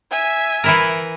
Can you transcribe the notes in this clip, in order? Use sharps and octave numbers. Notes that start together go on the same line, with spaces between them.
E5 G#5
E3 E4 A#4